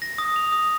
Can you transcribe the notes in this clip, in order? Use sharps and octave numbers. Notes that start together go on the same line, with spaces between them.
A#6
D#6
F7
D#6